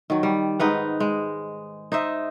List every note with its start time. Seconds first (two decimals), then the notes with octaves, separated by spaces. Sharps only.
0.10 D#3 F#3
0.23 G3
0.60 G#2 D#4 B4 F#5
1.00 G#3
1.92 D#4 C5 E5